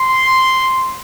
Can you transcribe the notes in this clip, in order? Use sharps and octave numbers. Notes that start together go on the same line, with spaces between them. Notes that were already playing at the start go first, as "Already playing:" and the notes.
Already playing: C6